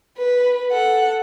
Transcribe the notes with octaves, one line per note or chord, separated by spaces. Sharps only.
B4
A4 F#5